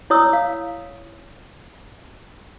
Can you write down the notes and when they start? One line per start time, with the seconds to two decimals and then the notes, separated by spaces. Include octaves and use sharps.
0.10 E4 C#5 D#6 E6
0.33 F5